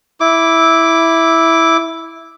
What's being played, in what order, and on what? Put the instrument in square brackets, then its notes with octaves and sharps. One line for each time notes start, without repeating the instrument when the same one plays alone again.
[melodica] E4 D6